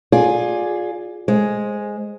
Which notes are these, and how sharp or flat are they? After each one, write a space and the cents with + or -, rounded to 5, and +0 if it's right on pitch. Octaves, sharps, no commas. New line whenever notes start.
F4 +25 G#4 +0 D5 +0
G#3 +0 C5 +0